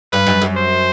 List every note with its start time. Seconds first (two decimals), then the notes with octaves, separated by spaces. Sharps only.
0.13 G2 B4
0.27 F#2
0.41 F#2
0.57 C5